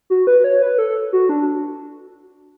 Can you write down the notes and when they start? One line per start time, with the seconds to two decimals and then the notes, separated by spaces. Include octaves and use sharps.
0.10 F#4
0.27 B4
0.44 C#5
0.62 B4
0.78 A4
1.13 F#4
1.29 D4